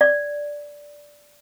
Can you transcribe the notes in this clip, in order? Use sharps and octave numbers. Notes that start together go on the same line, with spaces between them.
D5